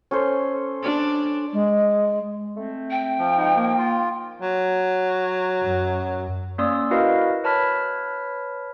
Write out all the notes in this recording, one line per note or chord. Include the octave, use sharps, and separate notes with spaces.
C#4 A4 C5
D4
G#3
A3 C4
G5
F3
G#3 D#4
A#3
F4
F#3
F#2
A#3 C#4 D5 C6 D#6 E6
E4 F#4 A#4 B4 D#5 F5
B4 C#5 A5 B5 F6 B6